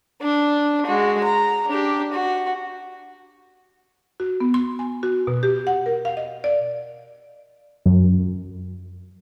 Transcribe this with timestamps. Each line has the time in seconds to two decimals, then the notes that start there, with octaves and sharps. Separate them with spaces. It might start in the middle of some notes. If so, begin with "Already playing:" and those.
0.22 D4
0.86 G#3 F#4
1.23 A#5
1.67 D4 G4
2.12 F#4
4.20 F#4
4.40 B3
4.54 C6
4.79 G#5
5.03 F#4
5.27 B2
5.43 G4
5.67 F#5
5.86 A#4
6.05 F5
6.17 D#5
6.44 D5
7.86 F#2